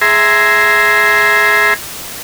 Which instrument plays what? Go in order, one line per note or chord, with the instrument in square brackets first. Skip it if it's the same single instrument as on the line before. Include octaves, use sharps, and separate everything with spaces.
[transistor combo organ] G#4 E5 A#5 C6